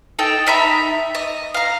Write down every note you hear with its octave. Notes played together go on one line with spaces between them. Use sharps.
D#4 A4 G5
D#4 E5 A#5 B5
D#5
F5 A#5